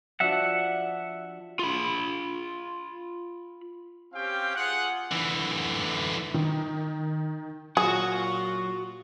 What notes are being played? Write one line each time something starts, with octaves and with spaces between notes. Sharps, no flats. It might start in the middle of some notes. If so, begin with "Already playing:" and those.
F3 D4 F#4 E5 F#5
F4 B5
C4 C#4 G4 F5 G5
F4 G#4 F#5
D3 E3
D#3
A#2 F#3 F4 F#4 G#4 F#5